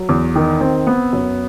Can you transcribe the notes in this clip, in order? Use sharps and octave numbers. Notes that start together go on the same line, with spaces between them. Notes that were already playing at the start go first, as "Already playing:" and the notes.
Already playing: F#3
E2
D#3
C4
B3
F#2